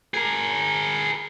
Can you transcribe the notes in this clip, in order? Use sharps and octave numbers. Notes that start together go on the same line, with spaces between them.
G#4 A#4